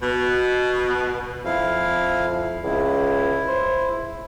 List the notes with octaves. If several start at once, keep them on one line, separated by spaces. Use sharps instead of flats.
B2
F2 E4 F5
C#2 E4
C5